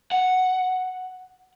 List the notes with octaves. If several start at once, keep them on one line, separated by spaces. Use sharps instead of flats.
F#5